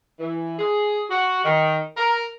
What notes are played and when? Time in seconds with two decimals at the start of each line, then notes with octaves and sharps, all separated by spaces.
0.19 E3
0.59 G#4
1.10 F#4
1.44 D#3
1.97 A#4